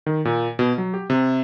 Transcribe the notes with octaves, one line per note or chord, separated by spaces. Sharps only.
D#3
A#2
B2
F#3
G4
C3